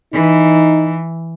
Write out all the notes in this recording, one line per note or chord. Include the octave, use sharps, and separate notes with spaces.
E3 D#4